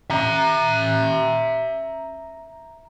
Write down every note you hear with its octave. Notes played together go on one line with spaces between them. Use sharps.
E5 A#5